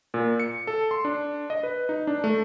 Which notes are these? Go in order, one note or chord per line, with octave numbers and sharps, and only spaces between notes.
A#2
C#7
A4
C6
D4
D#5
B4
D#4
D4
A3